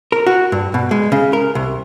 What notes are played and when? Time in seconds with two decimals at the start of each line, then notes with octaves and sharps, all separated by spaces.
0.12 A#4
0.27 F#4
0.52 G2
0.74 B2
0.91 G#3
1.12 C#3
1.33 A#4
1.55 C2